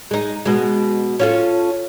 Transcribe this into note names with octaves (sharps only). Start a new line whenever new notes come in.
G#3 D#4
B2 G#3
C#4 F4 A4